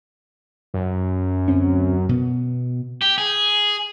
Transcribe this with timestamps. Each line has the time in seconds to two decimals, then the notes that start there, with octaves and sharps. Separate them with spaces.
0.74 F#2
1.48 D2 C4 C#4
2.09 B2 B3
3.02 G4
3.18 G#4